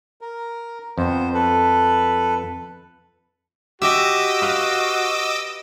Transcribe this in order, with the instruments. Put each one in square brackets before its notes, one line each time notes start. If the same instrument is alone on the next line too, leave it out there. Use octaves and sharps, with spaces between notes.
[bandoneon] A#4
[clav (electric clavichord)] F2 [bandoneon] B3 C5
[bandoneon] A4 B4
[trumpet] F#4 [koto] G4 E5 [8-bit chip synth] D#5 D6 E6
[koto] B4 F5